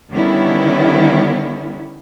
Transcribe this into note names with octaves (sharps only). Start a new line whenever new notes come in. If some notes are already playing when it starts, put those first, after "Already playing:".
D3 D#3 G3 B3 C#4 E4